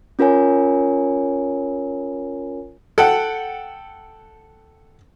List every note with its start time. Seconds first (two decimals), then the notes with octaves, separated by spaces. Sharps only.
0.19 C#4 F4 A#4 C#5 G#5
2.98 A4 F#5 G5